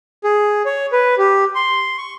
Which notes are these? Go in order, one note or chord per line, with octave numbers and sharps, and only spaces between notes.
G#4
C#5
B4
G4
C6
C#6